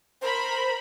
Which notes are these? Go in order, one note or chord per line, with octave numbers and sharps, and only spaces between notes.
A#4 C5 B5